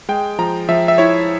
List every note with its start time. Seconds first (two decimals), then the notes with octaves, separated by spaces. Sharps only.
0.09 G#3 G5
0.39 F3 A#5
0.69 F3 E5
0.88 E5
0.98 E4 C#5